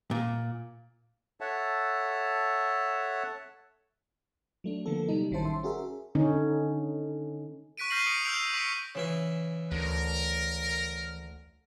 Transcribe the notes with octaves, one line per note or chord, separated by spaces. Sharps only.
A#2
A4 C#5 E5 F#5 A5
F#3 A3 D4
D3 F3 A#3 B3 A4
C3 F#3 G3 D#4
A1 D#3 C#4 E4 C5 A5
E5 C6
C#4 F#4 G#4 A#4 E5
D3 C#4 D#4
C#6 F#6 B6 D7 D#7
F6 G6 A#6 C7 D#7 F#7
D#6 C#7 D7
E6 F6 G6 C7 D7 F7
C#6 B6 C#7 D7
C#3 E3 E4
D2 A#4